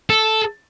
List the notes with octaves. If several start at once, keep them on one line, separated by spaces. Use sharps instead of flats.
A4